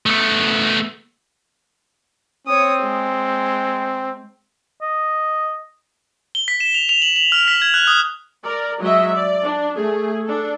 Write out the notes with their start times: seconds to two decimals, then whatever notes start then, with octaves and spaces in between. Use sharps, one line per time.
0.06 A3 B3
2.47 C4 C#5 D#6
2.82 G#3
4.82 D#5
6.35 G7
6.48 B6
6.60 E7
6.74 F7
6.89 F7
7.02 F#7
7.16 F#7
7.32 F6
7.48 B6
7.62 G#6
7.74 F#6
7.87 D#6
8.44 A#4 D5
8.80 F#3 G#3 D#5 E5
9.14 D5
9.45 D4
9.76 A3 G#4
10.25 D4 A4